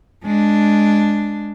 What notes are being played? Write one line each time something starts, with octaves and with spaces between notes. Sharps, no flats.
G#3 D4